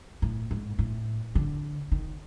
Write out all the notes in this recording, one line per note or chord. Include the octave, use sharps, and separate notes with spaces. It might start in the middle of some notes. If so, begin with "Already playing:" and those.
A2
G#2
A2
D3
D#3